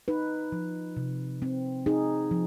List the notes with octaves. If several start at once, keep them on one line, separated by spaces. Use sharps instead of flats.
D#4 B4
F3
C3
C4
D#4 G#4
F3